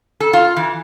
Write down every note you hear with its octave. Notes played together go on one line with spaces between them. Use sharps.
A4
F4
E3